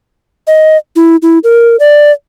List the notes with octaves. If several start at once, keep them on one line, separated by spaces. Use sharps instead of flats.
D#5
E4
E4
A#4
D5